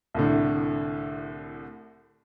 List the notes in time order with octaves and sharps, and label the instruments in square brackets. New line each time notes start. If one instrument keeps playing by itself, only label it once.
[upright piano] C2 A2 D3